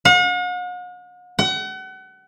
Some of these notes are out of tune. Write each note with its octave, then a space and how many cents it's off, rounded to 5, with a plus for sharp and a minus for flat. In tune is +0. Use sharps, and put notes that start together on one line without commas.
F#5 -45
F#5 +35